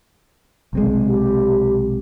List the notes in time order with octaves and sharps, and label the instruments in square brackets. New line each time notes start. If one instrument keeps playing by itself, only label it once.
[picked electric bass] B1 C3 G#3
[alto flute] G4